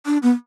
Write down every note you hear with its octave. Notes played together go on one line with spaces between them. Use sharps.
D4
B3